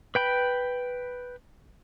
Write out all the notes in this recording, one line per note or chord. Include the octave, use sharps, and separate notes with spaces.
B4 G5 B5